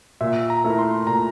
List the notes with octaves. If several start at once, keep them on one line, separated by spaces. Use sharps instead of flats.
A#2 E5
A#5
A3 E4 A#4
C6
A#2 A#5